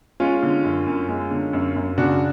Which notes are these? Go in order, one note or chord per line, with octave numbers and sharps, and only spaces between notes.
G#3 C#4 F4
D3
F#2
F#2
G#3
D3
F#2
F#2
C#3 D4 F#4